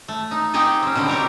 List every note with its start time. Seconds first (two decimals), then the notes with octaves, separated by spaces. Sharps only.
0.08 A3
0.31 D#4
0.54 C4 D#4 G4 G#4 D#5
0.83 C4 C#4
0.95 B2 D3 C4
1.08 C4 G4 A#4 C#5